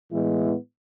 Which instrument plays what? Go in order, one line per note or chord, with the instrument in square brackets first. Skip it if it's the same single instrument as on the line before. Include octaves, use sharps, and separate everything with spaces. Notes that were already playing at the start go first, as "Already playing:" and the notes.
[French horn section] A2 E3 G#3 B3 E4